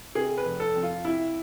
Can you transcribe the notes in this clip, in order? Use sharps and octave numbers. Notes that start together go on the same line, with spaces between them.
C3 G#4
B4
F1
A4
F2
F4
C3 E4